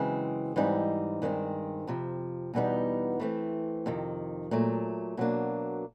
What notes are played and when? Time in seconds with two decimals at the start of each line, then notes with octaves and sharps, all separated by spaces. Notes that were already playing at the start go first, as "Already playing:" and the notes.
Already playing: F#2 C#3 E3 G#3 C4
0.56 G#2 E3 G3 C4 D#4
1.22 G2 D#3 G#3 C4
1.87 F2 C3 F3
2.54 E2 B2 G3 B3 D#4
3.20 E3 A3 C4
3.86 F2 C3 D#3
4.51 A#2 F#3 A3
5.17 B2 F#3 A#3 D4